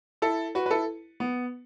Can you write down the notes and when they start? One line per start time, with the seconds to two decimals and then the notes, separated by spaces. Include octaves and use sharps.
0.22 E4 A4
0.55 F#4 B4
0.66 B4
0.71 E4 A4
1.20 B3